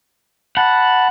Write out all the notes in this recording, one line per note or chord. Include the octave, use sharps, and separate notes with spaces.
F#5 A5 B5